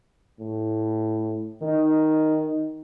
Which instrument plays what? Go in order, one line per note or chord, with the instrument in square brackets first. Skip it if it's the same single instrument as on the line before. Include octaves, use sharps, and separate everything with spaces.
[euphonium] A2
[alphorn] D#3 [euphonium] D#4